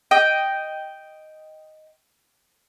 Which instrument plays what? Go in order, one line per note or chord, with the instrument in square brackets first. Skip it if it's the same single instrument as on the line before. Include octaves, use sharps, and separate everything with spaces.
[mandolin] D#5 G5